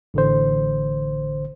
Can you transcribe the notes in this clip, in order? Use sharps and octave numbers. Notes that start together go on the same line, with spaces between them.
A1 D3 C5